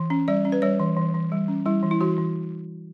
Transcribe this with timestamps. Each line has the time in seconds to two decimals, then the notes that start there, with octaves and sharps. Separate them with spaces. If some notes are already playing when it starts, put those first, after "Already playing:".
Already playing: E3
0.10 C#4
0.28 G3 D5
0.45 C#4
0.52 B4
0.62 G3 C#5
0.80 E3
0.97 E3
1.15 E3
1.32 G3
1.48 C#4
1.66 G3 E4
1.83 E3
1.91 E4
2.01 E3 F#4
2.18 E3